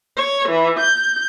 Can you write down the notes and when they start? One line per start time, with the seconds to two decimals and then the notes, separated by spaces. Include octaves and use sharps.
0.16 C#5
0.48 E3
0.79 G6